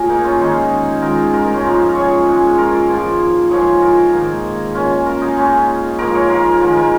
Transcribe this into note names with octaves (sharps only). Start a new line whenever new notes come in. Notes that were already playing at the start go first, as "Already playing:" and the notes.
Already playing: A#2 G#4 A#4 C#5
A#3 D#4
C#4 F4
G#2 D#3 G#3 D#4 G#4
G#2 D#3 G#3 F4 A#4
F4 A#4
A#3 D#4
C#4 F4
G#2 F3 G#3 F4 A#4
G#4 C#5
G#2 G#3
F4 A#4
G#2 F3 A#3
G#2 F3 A#3 G#4 C#5
F4 A#4
G#2 D#3 A#3
C#3 A#3 C#4 F4
F4 A#4
D#4 G#4
G#2 G#3 C#4 F4
G#2 F3 A#3 F4 A#4
G#4 C#5
F4 A#4
G#2 D#3 G#3 F4 A#4
F4 A#4